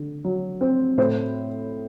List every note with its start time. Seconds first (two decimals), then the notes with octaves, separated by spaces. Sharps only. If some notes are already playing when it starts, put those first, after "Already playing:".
Already playing: D3
0.24 F#3
0.61 C4
0.98 A2 C5